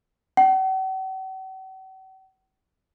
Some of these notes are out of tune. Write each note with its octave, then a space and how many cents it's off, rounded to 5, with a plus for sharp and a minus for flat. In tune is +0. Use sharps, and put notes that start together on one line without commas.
F#5 +45